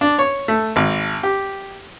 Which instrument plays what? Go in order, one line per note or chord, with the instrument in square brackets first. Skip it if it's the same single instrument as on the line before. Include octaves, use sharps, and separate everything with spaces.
[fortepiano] D4
C#5
A3
G#1
G4